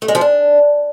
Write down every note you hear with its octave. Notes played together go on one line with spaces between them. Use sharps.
A3
G#3
F3
D4